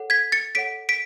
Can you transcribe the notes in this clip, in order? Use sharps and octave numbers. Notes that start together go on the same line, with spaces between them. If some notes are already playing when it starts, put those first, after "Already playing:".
Already playing: A4 C#5 F#5
G#6 B6
A6 C#7
A4 C#5 F#5 B6 D7
B6 D7